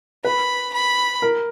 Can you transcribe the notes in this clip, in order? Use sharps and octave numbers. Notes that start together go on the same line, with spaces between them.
B4 B5
B5
A#4